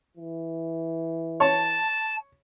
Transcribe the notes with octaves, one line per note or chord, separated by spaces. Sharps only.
E3
C#5 A5